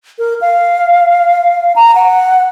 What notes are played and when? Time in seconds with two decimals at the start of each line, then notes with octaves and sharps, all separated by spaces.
0.18 A#4
0.41 F5
1.76 A#5
1.95 F#5